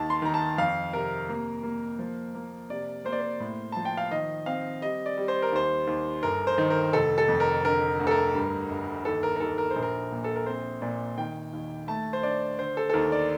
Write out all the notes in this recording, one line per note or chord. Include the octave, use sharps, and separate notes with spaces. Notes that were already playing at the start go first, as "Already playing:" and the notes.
Already playing: D#2 A5
C6
D#3 A#5
A5
F2 F5
C3 A#4
A#3
A#3
F3
A#3
C3 D5
A#3 C5
D5
C5
A2
F3 A5
G5
F5
D#3 D#5
C4 F5
G3 D#5
D5
G3
C5
A#4
D#2 C5
D#2
G1 A#4
C5
D#3
A#4
F1 A4
A4
F2
A#4
D3 A#4
D2
A4
A#4
G2
G1
D#2 A4
A#4
A#4
D#2 A4
A#4
C5
A#1
A#4
A#2
A4
A#4
C4 C5
A#2 D5
D#3 G5
D#2
A3 A5
C5
D4 D5
D3 C5
A4
A4
D#2 A#4
D5